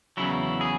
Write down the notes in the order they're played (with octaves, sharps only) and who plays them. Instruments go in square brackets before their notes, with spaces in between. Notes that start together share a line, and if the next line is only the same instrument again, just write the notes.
[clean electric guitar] E2 C#3 F#3 E4
G#4